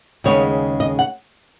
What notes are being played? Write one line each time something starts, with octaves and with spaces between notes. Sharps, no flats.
D#2 C#3 G#3 B3 C#5
D#5
F#5